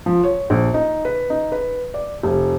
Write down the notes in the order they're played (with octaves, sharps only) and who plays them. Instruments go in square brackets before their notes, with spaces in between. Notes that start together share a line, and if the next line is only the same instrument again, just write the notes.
[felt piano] F3
C#5
A#1
D#4
B4
D#4
B4
D5
F1